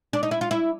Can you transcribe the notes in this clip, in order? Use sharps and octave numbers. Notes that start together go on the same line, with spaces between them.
D4
D#4
E4
F4
E4